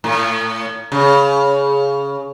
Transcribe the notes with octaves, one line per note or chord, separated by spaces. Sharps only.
A2
C#3